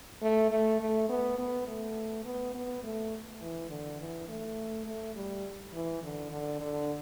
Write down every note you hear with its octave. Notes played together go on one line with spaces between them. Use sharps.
A3
A3
A3
B3
B3
A3
B3
B3
A3
E3
D3
E3
A3
A3
G3
E3
D3
D3
D3